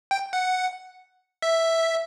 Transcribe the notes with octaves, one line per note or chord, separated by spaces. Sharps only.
G5
F#5
E5